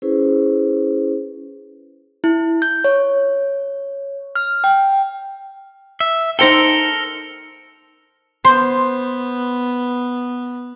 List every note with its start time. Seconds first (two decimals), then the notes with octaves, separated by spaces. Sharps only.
0.02 C#4 E4 G#4 B4 C5
2.24 E4
2.62 G6
2.84 C#5
4.36 F6
4.64 G5
6.00 E5
6.39 D#4 A4 A#4 C5 G5 A#6 C#7 G7
8.45 B3 C5